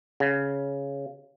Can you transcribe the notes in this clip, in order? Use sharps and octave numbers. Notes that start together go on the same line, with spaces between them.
C#3